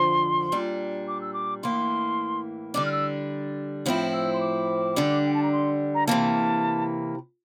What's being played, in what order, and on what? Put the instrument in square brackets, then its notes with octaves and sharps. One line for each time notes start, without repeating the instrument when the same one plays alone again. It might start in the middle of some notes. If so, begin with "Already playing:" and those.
Already playing: [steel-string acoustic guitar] F2 D3 F3 [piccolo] C6
[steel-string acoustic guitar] A#2 G3 D4
[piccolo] D6
E6
D6
[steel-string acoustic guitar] A2 E3 A#3 [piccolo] C6
[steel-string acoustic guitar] D3 G3 D4 [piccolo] D6
[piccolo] F6
E6
[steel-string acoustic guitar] A2 F3 C4 E4
[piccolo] E6
C6
D6
[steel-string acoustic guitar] D3 G3 D4
[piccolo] G5
A5
A#5
C6
A#5
[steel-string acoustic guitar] C3 E3 A#3 [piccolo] A5